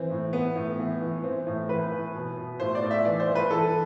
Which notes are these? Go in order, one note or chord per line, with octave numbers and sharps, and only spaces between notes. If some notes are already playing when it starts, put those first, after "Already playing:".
Already playing: E3 C4
A2
E3 B3
A2
E3
E3
E3 C4
A2
E3 B4
E3
B2
B2
A2 C5
D5
A2
E5
E3 D5
C5
E3
B4
E3 A4